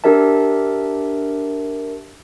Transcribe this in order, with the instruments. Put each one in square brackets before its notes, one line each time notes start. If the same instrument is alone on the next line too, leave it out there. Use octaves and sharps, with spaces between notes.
[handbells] D4 G4 A#4 E5 A5